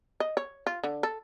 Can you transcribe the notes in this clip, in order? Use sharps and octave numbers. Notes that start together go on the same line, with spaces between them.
D#5
C#5
F4
D3
A4